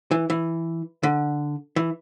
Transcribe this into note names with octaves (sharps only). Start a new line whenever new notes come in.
E3
E3
D3
E3